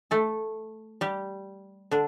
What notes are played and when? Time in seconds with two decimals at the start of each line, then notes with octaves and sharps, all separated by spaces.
0.11 A3 A4
1.01 G3 G4
1.91 D3 D4